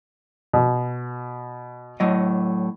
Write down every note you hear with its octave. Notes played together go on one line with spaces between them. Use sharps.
B2
A2 F#3 D#5